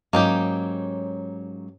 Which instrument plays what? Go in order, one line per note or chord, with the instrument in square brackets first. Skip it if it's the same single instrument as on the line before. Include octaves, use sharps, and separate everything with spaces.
[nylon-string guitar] G#2 F#3 C#4 [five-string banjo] A#3 D#4 G4